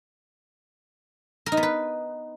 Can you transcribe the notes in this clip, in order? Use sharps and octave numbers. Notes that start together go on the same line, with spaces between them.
A#4
D#4
B3
B4